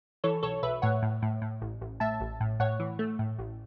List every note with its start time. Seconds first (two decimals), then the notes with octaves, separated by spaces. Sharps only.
0.24 E3 A4 C#5
0.43 B1 A4 C#5
0.63 B1 B4 E5
0.82 A2 C#5 F#5
1.02 A2
1.22 A2
1.42 A2
1.62 A1
1.81 A1
2.00 A2 E5 A5
2.21 A1
2.40 A2
2.60 A2 C#5 F#5
2.80 E3
2.99 A3
3.19 A2
3.39 A1